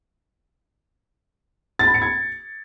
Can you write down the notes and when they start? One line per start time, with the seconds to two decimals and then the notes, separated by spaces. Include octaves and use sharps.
1.79 A6
1.87 B5
1.94 C#7
2.02 G#6